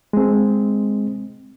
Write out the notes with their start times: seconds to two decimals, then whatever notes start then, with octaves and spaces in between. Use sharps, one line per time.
0.13 G#3 C4